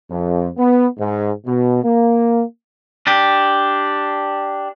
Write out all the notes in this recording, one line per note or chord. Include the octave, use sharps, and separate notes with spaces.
F2
B3
G#2
B2
A#3
D4 G4